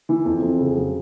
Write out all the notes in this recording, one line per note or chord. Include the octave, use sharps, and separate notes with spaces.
E3
F2
F2
C#3
F#3